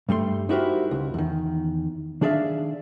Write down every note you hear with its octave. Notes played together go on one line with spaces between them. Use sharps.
G2 G3 A3 C6
D#4 E4 F#4 G4 A#4 C5
C#2
E2 D#3
D#3 D4 G#4 D5 E5 F5